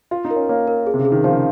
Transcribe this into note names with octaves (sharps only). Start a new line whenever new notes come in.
F4 F5
D#4
A#4
C#4
A#3 C#5
A#4
G#4
C3
C#3
G#4
D#3
F3 C5
C#3